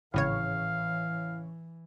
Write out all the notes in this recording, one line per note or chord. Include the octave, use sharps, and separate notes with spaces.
G#1 A2 C#3 E3 C#5 F5